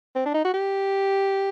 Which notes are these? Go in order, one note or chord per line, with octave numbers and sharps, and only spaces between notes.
C4
D4
D#4
F#4
G4